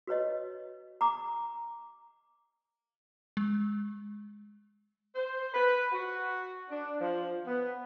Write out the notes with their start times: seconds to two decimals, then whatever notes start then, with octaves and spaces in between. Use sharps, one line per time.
0.07 F#4 B4 C#5 D#5
1.01 A#5 D6
3.37 G#3
5.16 C5
5.53 B4
5.92 F#4
6.70 D4
7.00 F3
7.47 B3